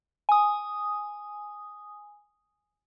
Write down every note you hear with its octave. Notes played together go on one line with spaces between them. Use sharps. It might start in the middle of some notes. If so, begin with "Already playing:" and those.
G#5 D#6